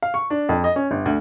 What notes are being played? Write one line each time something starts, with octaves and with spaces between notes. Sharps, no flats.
F5
C#6
D4
F2
D#5
C#4
G1
D2